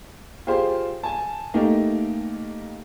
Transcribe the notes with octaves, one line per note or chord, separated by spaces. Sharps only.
F4 G4 G#4 C5
G#5 A5
A3 A#3 D#4 G4